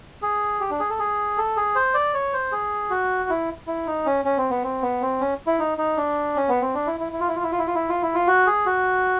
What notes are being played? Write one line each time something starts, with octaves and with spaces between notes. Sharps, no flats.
G#4
G4
D4
G#4
A4
G#4
A4
G#4
C5
D5
C#5
C5
G#4
F#4
E4
E4
D#4
C#4
C#4
C4
B3
C4
B3
C4
C#4
E4
D#4
D#4
D4
C#4
B3
C4
D4
E4
E4
E4
F4
E4
F4
E4
F4
E4
F4
E4
F4
E4
F4
F#4
G#4
F#4